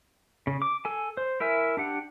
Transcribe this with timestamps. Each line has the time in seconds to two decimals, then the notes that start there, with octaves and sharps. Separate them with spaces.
0.47 C#3
0.62 D6
0.85 A4 G#5
1.17 C5
1.40 E4 A#4 E5 G#5
1.77 D4 G4 F#5